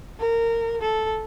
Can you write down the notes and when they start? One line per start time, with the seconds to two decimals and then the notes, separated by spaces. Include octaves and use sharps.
0.20 A#4
0.81 A4